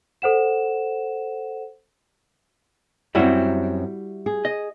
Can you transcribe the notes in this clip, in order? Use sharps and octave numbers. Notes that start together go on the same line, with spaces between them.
A4 C5 F#5 E7
F#2 G3 C4 E4 F#4
G#4
D#5